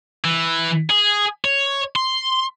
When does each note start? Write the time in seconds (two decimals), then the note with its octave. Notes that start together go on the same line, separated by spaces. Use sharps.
0.24 E3
0.90 G#4
1.45 C#5
1.96 C6